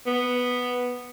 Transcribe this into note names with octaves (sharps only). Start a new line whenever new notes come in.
B3